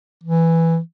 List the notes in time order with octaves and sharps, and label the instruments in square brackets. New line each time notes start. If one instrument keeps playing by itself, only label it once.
[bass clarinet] E3